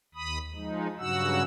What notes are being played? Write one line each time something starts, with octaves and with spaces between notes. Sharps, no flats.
D#2 B5 D#6
F3 G#3 D#4
G2 C#3 F#3 F#4 F#5 E6